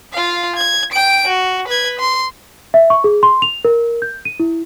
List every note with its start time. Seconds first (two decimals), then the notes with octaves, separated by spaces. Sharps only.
0.12 F4 F5
0.56 G#6
0.92 G5 D7
1.27 F#4
1.68 B4 G#6
1.99 C6
2.74 E5
2.90 C#6
3.04 G#4
3.23 C6
3.42 F7
3.65 A#4
4.02 G6
4.25 D#7
4.40 E4